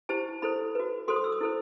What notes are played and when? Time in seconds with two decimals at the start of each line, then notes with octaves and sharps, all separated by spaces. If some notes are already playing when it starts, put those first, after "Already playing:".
0.09 E4 G4 C5 A5
0.42 E4 A4 C5 B5
0.75 F#4 B4
1.08 F#4 A4 C5 C6
1.16 D#6
1.24 E6
1.32 D#6
1.41 E4 A4 C5